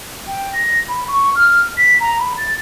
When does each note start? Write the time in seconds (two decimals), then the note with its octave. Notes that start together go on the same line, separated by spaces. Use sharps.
0.27 G5
0.53 A#6
0.88 B5
1.08 C#6
1.35 F6
1.77 B6
2.00 A#5
2.19 B5
2.37 A6